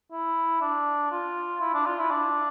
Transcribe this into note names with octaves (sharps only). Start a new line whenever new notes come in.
E4
D4
F4
E4
D4
F4
E4
D4